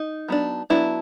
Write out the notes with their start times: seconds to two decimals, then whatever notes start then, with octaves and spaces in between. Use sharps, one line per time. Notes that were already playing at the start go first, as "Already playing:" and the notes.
Already playing: D#4
0.28 F#3 B3 D4
0.70 F#3 B3 D4 E4